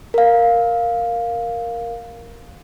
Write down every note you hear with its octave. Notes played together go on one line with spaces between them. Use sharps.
A#4 F5